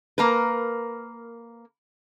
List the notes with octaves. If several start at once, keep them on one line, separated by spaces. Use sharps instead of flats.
A#3 A#4 B4